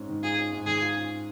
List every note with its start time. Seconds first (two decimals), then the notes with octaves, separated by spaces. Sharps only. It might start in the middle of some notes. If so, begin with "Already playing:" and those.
Already playing: G#2 C#4
0.09 D#3
0.23 F4 G#4
0.37 C#4
0.52 G#2
0.66 D#3 G#4
0.81 F4
0.95 C#4